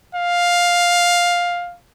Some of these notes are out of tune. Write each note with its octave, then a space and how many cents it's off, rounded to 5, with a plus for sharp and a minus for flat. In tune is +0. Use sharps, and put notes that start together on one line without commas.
F5 +10